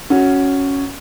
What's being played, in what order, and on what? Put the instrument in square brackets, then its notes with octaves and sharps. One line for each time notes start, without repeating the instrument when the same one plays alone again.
[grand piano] C#4 F#4